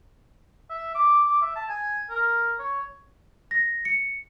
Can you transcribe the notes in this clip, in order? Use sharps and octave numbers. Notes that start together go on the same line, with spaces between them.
E5
D6
D6
E5
A5
G#5
A#4
C#5
A#6
C#7